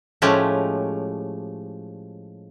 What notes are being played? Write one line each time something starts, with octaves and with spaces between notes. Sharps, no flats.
A2 F3 G#3 A3 C#4 G4